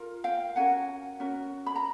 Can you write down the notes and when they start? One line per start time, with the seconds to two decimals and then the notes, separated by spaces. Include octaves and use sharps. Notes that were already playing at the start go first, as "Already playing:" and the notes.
Already playing: F4 A#4
0.24 F5 G5
0.56 C#4 F#4 A#4 F#5 G#5
1.20 C#4 F#4 A#4
1.66 B5
1.76 A#5